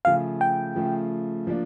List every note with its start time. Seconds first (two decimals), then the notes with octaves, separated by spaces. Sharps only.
0.05 C#3 F3 A3 F5
0.41 G5
0.76 C#3 F3 A3
1.47 F3 A#3 D4